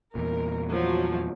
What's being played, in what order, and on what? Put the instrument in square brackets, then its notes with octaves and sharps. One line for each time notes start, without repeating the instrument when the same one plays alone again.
[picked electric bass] E2 A#2 [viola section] A#4
[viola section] F3 F#3